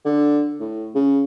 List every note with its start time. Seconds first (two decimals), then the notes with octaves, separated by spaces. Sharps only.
0.05 D3
0.60 A2
0.95 C#3